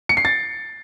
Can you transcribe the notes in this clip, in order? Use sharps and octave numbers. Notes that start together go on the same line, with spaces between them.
C#7
C7
A6